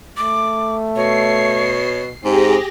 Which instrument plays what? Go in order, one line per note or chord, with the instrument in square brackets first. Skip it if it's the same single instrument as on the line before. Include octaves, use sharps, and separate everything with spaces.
[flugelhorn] A3 [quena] D6
[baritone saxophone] B2 [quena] C#5 [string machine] C7
[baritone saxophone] G#2 [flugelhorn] C4 [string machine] G4 G#4 A#6